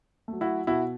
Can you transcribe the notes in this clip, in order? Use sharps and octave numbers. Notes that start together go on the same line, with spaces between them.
A3
F#3
E4 F#4
B2 E4 F#4